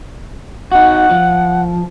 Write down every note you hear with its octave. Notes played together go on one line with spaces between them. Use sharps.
D#4 F#4 F#5
F3